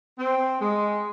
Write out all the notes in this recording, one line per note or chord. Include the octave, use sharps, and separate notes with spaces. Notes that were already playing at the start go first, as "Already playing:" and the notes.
C4
G#3